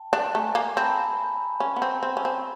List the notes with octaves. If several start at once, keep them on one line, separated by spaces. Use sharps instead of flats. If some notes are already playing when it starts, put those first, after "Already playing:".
Already playing: G5 A5
D4
A3 G#5 A#5
A#3
C4 A5 B5
C#4
B3
C4
C4
C#4
C4